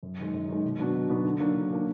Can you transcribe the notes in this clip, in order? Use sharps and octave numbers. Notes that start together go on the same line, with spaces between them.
F#2
D#3 G#3
F#2
D#3 G#3
B2
F#3 B3 D4 F#4
B2
F#3 B3 D4 F#4
D3
F#3 A#3 D4
D3
F#3 A#3 D4